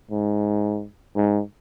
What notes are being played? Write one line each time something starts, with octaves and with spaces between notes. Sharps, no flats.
G#2
G#2